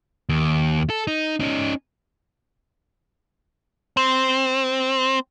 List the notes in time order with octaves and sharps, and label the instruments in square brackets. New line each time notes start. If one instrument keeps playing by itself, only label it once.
[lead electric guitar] D#2
A4
D#4
C#4 D#4
C4